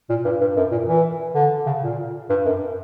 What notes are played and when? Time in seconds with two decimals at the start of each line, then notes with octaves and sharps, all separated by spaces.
0.09 A#2
0.25 G2
0.41 G2
0.56 F#2
0.71 A#2
0.88 E3
1.35 D3
1.66 C#3
1.82 A#2
2.30 G2
2.45 F#2